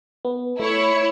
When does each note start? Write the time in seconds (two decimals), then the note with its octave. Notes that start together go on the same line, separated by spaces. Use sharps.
0.25 B3
0.60 A3 E4 C#5